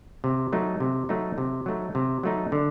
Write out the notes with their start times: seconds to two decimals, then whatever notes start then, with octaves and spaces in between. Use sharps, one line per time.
0.24 C3
0.52 F#3 A3 D#4
0.80 C3
1.09 F#3 A3 D#4
1.38 C3
1.66 F#3 A3 D#4
1.95 C3
2.23 F#3 A3 D#4
2.52 D3